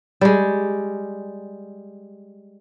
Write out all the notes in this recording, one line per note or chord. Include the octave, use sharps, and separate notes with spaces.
G3 G#3